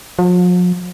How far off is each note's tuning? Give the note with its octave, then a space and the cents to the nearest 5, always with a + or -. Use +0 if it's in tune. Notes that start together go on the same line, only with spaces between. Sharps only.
F3 +45